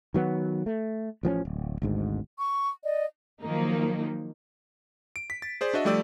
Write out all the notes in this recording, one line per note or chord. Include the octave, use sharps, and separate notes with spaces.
D#3 F#3 B3
A3
A1 F3 B3 C#4
D1
G#1 D2 G#2
C#6
D5 D#5
D#3 F3 F#3 A#3 D#4
D7
B6
A6
G#4 C5 D5
D4 F#4 D#5 E5
F3 G3 A3 G4 D5 E6